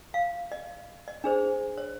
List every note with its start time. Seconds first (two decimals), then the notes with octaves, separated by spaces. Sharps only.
0.14 F5
0.52 D#5
1.08 D#5
1.24 D4 G#4 C5
1.78 C#5